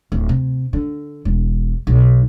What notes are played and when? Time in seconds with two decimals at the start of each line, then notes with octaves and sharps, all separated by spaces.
0.12 D1
0.29 C3
0.73 D3
1.25 E1
1.87 B1